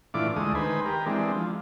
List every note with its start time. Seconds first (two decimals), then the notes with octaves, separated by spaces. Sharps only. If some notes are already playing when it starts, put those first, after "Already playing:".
0.14 A2 E3 D4 F4 D6
0.36 D2 G#3 A3 D#6
0.55 D#3 B4 C5 G#5
0.85 G4 A#4
1.06 E3 G#3 C4 D4
1.35 F3